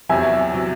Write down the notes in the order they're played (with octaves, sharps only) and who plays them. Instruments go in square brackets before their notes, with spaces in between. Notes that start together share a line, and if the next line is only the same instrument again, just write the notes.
[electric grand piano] E2 C3 F#3 [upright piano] E5 G#5
[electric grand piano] C3 F#3